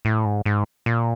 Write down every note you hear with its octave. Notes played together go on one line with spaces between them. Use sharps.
A2
G#2
G#2
A#2